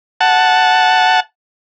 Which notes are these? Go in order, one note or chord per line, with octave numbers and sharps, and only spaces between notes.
F#5 A5